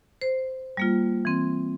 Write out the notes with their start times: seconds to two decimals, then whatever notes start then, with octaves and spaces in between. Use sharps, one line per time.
0.21 C5
0.77 G3 A#3 F4
1.25 E3 C4